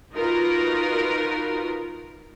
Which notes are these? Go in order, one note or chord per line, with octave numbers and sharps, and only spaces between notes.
D#4 F4 F#4 A#4 B4